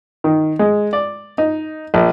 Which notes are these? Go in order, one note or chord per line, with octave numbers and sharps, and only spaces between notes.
D#3
G#3
D5
D#4
A#1